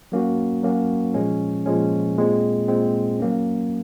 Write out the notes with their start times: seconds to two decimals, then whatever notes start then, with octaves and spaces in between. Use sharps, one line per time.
0.12 F#3 A#3 C#4 F#4
0.63 F#3 A#3 C#4 F#4
1.14 A#2 F3 G#3 C#4
1.66 A#2 F3 G#3 C#4
2.17 A#2 G#3 C4
2.68 A#2 G#3 C4
3.20 F#3 A#3 C#4